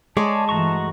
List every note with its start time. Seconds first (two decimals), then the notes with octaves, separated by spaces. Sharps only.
0.17 G#3 G#4 C#5 D5 A5
0.49 G2 E3 A3 F#4 A#5 C#6